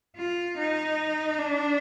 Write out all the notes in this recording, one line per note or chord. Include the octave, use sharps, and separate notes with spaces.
F4
D#4
D4